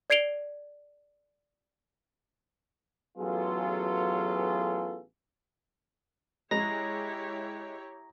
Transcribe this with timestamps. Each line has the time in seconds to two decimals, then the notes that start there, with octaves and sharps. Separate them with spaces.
0.10 D5 G#6 C7 D7 F7 G7
3.18 A1 F#3 B3 F4 G#4 A4
6.51 G#3 E4 G4 C#5 A#5 A#6